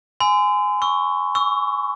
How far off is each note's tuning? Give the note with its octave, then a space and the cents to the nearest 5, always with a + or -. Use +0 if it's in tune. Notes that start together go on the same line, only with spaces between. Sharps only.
G#5 +5 C6 -40 E6 +0
C#6 +0 E6 +0
C#6 +30 E6 +0